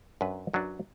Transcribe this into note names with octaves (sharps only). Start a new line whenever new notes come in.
F#2 F#3 D4 B4
F#2 F#3 D4 B4